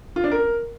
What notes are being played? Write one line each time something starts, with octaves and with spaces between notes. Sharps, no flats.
F4
D4
A#4